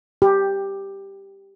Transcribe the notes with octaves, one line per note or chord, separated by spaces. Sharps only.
G4